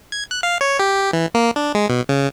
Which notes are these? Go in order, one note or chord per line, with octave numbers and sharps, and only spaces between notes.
G#6
F#6
F5
C#5
G4
E3
A#3
D4
G#3
B2
C#3